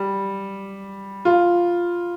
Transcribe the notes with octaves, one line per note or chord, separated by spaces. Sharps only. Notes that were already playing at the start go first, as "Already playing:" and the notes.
Already playing: G3
F4